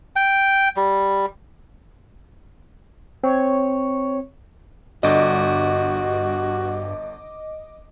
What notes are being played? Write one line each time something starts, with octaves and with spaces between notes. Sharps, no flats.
G5
G3
C4 C#5
G1 G2 D3 F#4 D5 D#5 D6